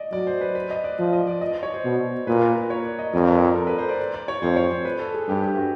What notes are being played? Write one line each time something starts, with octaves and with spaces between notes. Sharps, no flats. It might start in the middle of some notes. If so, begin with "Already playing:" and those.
Already playing: D5 D#5
F#3 D5
C5
B4
B4
D#5
D5
F3 D5
D#5
D5
D#5
D5
C#5
C5
B2
A#2 B4
A#4
B4
C#5
D5
D#5
F2 D5
A#4
A4
A#4
B4
C5
D5
D5
D5
C#5
F2 C5
C#5
C5
B4
A4
G#4
G2 G4
G4
F#4